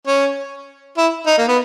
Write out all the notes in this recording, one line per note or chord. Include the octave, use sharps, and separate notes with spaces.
C#4
E4
D#4
A#3
B3